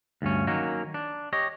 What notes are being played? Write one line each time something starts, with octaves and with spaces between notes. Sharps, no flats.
D2 G2 C#4
D#3 F#3 A#3 C#4
D4
G4 C#5 D#5